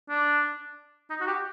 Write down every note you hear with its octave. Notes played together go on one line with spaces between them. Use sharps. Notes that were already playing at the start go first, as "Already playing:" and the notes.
D4
D#4
F#4
G4